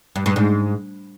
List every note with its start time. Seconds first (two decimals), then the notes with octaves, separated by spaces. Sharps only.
0.16 G2
0.26 G2
0.36 G#2